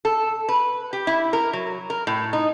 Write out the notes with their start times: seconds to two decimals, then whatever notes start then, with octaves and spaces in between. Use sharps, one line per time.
0.05 A4
0.49 B4
0.93 G4
1.07 E4
1.33 A#4
1.53 F#3
1.90 A#4
2.07 A2
2.33 D#4